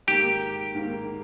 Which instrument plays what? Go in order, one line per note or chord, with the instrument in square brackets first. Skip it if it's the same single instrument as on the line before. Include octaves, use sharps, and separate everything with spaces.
[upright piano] G#2 D#3 A#3 [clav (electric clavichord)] G4
[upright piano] G#2 D#3 A#3